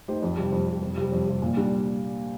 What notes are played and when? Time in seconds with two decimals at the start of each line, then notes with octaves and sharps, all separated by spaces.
0.08 A3 D#4 G4 C5
0.23 F2
0.37 C3 G3
0.52 F2
0.67 C3 G3
0.82 F2
0.97 C3 G3
1.12 F2
1.27 C3 G3
1.42 A#2
1.57 G3 D4